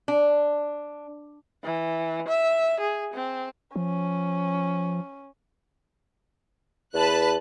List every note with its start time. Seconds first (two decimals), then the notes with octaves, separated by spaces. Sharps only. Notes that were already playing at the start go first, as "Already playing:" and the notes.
0.08 D4
1.64 E3
2.28 E5
2.80 G#4
3.13 C4
3.76 F3 C#4
6.94 E2 B4 A5 F#6